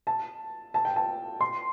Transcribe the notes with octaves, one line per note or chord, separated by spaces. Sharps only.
A5
A5
G5
A5
C6